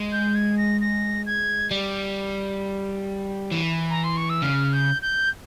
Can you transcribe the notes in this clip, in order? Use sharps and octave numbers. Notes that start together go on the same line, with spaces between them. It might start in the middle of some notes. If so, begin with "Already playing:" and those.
Already playing: G#3
G6
G#6
A#6
A#6
G#6
G3
E3
A#5
C6
C#6
E6
C#3 F6
G6
G6